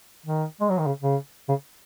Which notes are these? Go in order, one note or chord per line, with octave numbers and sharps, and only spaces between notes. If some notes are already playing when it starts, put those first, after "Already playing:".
D#3
G#3
F#3
D#3
C#3
C#3
C#3